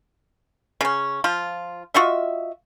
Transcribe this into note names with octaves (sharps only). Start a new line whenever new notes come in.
C#3 C#4
F3 F4
F4 F#4 D#5 E5